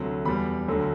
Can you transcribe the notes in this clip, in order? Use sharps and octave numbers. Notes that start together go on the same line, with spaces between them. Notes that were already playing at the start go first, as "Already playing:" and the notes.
Already playing: D2 C3 F#3 A3
E2 B2 G3 B5
D2 D3 F#3 A3